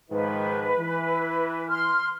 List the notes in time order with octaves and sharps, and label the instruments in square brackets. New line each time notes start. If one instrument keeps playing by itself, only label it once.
[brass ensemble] G#2 D#3 F3 [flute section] B4
[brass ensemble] E3
[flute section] C6 F6